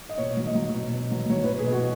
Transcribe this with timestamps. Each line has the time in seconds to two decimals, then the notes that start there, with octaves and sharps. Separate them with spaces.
0.09 D#5
0.18 B2 C#5
0.37 F#3
0.46 D#5
0.55 F#3
0.74 B2
0.93 B2
1.11 F#3
1.30 F#3 C#5
1.44 B4
1.49 B2
1.59 G#4
1.67 B2 F#4